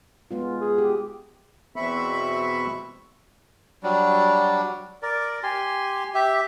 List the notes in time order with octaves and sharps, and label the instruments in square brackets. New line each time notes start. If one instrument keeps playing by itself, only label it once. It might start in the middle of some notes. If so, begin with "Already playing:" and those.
[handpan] G#3 B3 F4
[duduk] G#4
[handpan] G4
[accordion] E2 B2 C4 E5 B5 C#6
[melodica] F#3 G3 D4
A#4 D5
G4 G#5 C6
G4 E5